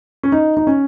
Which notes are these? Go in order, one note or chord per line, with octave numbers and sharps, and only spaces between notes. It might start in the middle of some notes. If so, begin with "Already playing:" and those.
C#4
D#4
D#4
C#4